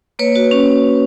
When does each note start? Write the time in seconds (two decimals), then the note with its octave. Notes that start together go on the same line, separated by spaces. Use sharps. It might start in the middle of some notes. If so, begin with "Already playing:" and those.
0.19 A#3 B4 C#5
0.36 F#4
0.51 C#4